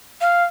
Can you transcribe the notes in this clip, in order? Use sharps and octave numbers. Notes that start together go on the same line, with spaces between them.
F5